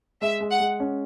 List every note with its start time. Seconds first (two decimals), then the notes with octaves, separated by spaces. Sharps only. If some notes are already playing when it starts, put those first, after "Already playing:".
0.21 G#3 E5
0.40 G#3
0.51 F#5
0.60 G#3
0.80 C#4